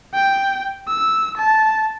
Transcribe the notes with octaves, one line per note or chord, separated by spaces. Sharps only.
G5
E6
A5